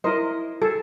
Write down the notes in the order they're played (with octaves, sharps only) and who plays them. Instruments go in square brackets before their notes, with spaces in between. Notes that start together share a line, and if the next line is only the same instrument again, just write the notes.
[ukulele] E4 C5 [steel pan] A#4 D#5
[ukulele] G#4 [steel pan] A4